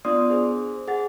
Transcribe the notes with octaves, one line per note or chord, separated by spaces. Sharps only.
B3 D4 F4 D5 C6 D#6
G#4 C5
G#4 F#5 A6